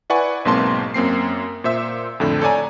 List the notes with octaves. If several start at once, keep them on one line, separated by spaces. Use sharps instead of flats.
E4 B4 D5 F#5 G#5 C#6
B1 G#2 A#3 C4 A5 C6
F#2 A#3 C4 C7
A#2 C5 E5 E6
F2 A2 D3
A4 C#5 D5 G#5 A#5